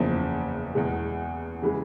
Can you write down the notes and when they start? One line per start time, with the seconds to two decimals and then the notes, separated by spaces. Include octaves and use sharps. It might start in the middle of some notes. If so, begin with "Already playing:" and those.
Already playing: F#1 E2 C#3 F3
0.75 E2 B2 G#3
1.62 C#3 E3 G#3